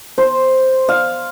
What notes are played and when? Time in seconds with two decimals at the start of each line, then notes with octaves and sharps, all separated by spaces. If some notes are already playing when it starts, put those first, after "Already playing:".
0.18 C5
0.89 F5